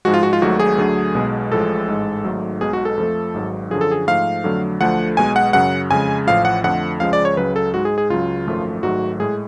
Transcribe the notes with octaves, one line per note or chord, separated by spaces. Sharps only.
G#2 F3 G#3 F#4
F4
F#4
F4
G#1 G#2 F#3 A3 F#4
G#4
D2 D3 F#3 A3
B1 B2 G#3
A1 A2 F3 G#3 A4
A1 G#2 G#3
G#1 G#2 F#3 A3
B1 B2 G#3 G#4
F#4
A4
F2 F3 A3
G#1 G#2 F#3
F#2 D3 F3 G#4
A4
G#4
G#2 F3 A3 F5
F2 D3 F#3 A3
D2 D3 F3 A3 F#5
B1 B2 G#3 G#5
F#5
F#2 C#3 F#3 F#5
F2 C#3 G#3 G#5
A1 A2 F3 F5
F#5
F2 D3 F3 A3 F#5
C#2 C#3 F3 G#3 F5
D5
C#5
C#2 C#3 F#3 B4
A4
G#2 G#3 F#4
G#4
G#4
C#2 C#3 F#3 F4
G#1 F#2 F3 A3
G#1 G#2 F#3 A3 F#4
A2 G#3 G#4